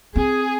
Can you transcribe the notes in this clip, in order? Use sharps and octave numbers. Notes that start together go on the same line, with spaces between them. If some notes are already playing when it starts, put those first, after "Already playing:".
C4 G#4